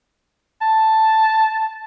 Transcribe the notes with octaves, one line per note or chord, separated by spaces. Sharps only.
A5